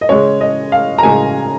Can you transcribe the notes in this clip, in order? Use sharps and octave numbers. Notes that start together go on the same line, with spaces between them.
D#5
C#3 G#3 C#4 C#5
D#5
F5
A#5
C#3 G#3 C#4 G#5